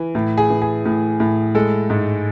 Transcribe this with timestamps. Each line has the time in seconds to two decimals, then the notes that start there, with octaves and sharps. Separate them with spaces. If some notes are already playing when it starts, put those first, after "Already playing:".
Already playing: E3
0.15 A2
0.38 G#4
0.50 E3
0.62 G#4
0.85 A2
1.20 A2
1.55 G#3 A4
1.90 G#2